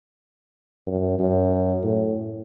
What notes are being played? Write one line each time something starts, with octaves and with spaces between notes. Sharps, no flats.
F#2
F#2
A2